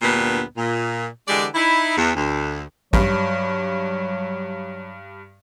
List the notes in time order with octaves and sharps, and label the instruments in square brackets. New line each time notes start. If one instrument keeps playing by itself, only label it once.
[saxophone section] D2 G2 A#2 B3
A#2
D3 E3 G#3 G4 D5
D#4 E4
E2
D2
[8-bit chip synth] A1 [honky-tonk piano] G2 [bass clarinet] F#3